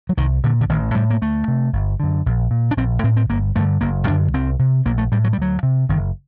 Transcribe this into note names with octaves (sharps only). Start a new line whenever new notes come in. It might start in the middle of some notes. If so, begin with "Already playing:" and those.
F#3
C2 D#3
A#2 D3
D3
A1 D#3
A2 G3
A#3
D2 A3
C3
G1
F#2 D3
A#1
A#2
D4
A#1 C4
A2 C4
C4
G1 A#3
G2 D3 A3
F#1 A#3
F#2 D3 D4
C2 C4
C3
A#1 A#3
A3
A2 G3
F#3
G3
D2 F#3
C3
F#1 D#3